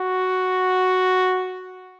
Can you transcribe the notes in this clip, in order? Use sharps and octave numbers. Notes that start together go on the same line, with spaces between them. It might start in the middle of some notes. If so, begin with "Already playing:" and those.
Already playing: F#4